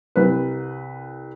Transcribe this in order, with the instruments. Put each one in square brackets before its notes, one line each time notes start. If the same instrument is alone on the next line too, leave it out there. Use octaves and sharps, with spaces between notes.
[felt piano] C2 B4